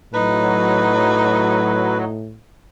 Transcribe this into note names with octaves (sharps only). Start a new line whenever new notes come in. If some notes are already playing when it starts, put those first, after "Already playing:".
A2 F#3 D#4 B4